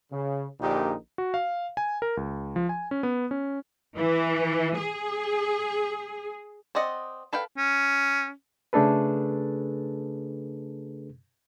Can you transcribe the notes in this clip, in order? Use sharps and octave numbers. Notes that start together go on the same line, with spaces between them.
C#3
A#1 A#2 D3 D#4 G4
F#4
F5
G#5
A#4
C#2
F3
G#5
C#4
B3
C#4
E3
G#4
C4 D5 D#5 F#5
A4 B4 F5 G5
C#4
C#3 A3 D4 G#4 A4 B4